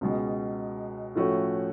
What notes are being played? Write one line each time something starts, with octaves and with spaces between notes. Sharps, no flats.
C#2 B2 G#3
A2 F3 A3 C#4 F#4